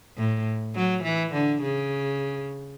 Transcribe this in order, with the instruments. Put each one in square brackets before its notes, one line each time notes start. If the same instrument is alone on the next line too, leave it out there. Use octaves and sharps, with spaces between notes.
[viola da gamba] A2
F#3
E3
D3
C#3